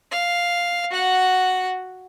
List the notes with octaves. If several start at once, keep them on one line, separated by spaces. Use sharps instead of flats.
F5
F#4 F#5